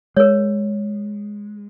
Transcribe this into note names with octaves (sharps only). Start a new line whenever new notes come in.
G#3 A#4 C#5